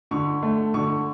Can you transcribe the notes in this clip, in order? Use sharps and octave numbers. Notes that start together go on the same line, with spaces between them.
D3 C#6
A3
D3 C#6